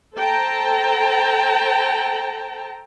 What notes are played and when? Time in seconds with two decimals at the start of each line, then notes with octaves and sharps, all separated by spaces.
0.16 A4 C5 G5 A5 A#5